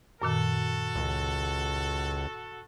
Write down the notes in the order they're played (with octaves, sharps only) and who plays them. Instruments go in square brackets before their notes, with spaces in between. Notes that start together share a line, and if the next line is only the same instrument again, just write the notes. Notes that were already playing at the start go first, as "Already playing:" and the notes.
[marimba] F#2 A#2 D#3 [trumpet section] F#4 A4
[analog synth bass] C#2